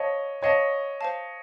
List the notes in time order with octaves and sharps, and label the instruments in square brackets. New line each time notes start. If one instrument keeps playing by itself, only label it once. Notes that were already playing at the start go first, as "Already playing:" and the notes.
Already playing: [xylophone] C5 F5 A5 [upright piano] C#5 D#5
[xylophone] C5 F5 A5 [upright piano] C#5 D#5
[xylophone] C5 F5 A5